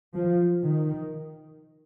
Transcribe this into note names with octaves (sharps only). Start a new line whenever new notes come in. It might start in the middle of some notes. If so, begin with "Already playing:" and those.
F3
D#3